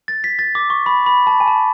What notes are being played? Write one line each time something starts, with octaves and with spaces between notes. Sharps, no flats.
A6
B6
A6
D6
C#6
B5
B5
A5
G#5
A5